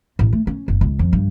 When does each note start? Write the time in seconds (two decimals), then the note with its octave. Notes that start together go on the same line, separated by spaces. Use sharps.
0.19 A1
0.33 A3
0.47 C#4
0.68 F#1
0.81 C#2
0.99 F2
1.13 G2